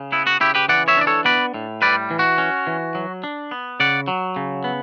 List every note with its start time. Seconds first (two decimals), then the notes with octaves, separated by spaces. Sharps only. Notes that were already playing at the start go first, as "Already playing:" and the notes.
Already playing: C#3
0.12 B3 E4
0.27 F#4
0.40 C#3 E4 G4
0.55 G4 B4
0.68 E3 D5 F#5
0.88 C#5 E5
0.97 D4 D5
1.07 A4 C#5
1.25 B3 B4 D5
1.54 A2
1.82 G3 B4 D5
2.10 E3
2.19 F#4
2.38 C#4
2.67 E3
2.95 F#3
3.24 D4
3.51 B3
3.80 C#3 D5 F#5
4.08 F#3
4.36 C#3
4.64 B3